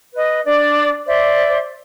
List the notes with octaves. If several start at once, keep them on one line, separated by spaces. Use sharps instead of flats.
B4 D#5
D4 D5
C5 D5 E5